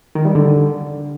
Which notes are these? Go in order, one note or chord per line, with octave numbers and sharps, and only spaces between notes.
D#3
G3
D3